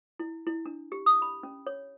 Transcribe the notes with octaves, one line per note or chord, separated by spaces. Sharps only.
E4
E4
D4
G4
D#6
B5
C#4
C#5